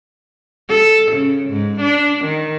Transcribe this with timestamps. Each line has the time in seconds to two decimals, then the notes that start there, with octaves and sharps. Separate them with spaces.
0.69 A4
1.12 C#3
1.50 G#2
1.81 D4
2.25 D#3